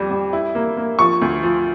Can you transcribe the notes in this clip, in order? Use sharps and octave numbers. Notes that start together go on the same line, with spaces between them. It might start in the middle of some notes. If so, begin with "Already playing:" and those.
Already playing: F2 G3
G3
E4
A#3
A#3
F3 C#6
D2
F3